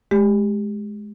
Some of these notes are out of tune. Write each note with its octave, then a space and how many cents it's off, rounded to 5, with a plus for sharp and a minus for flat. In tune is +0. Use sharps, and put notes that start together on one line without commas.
G#3 +15 G4 +10